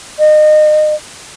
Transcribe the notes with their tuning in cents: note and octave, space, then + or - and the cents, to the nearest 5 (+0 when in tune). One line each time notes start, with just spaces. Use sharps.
D#5 -30